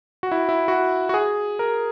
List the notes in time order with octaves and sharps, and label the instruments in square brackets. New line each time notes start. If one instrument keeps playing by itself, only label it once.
[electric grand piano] F#4
E4
E4
F#4
F#4
G#4
A#4